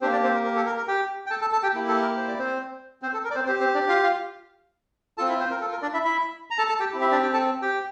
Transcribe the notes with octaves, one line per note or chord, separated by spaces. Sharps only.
A#3 C4 D4 G4 C5
D4 D5
C4 C5
A#4
A#4
A4
A#4
A#4
G4 G5
G5
A4 A5
A4 A5
A4 A5
G4 G5
A#3 E4 G4
A4
A#4
C5
D5
C4 C5
C4 C5
A4
A#4
D5
C4 C5
C4 G4 C5
C4 C5
D4 D5
F4 F5
F4 F5
C4 F4 A4 A5
E4 E5
C4 C5
A#4
A4
A#4
D4 D5
E4 E5
E4 E5
A#5
A4 A5
A4 A5
G4 G5
C4 E4 G4
E4 E5
D4 D5
G4 G5
A4 A5
G4 G5